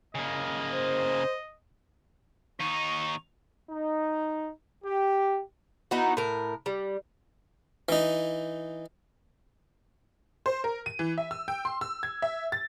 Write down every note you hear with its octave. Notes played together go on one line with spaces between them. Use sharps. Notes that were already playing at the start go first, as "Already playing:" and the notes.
C#3 A#3 D#5
C5
D#2 D#4 C#6
D#4
G4
B3 D#4 E4 F#4
A2 A#4
G3
E3 D#4
C5
A#4
D#7
E3
E5
E6
G5
C6
E6
G#6
E5
A6